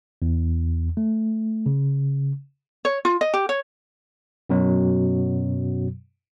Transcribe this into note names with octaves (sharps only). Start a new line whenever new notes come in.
E2
A3
C#3
C#5
F4
D#5
G4
C#5
F#2 B2 F#3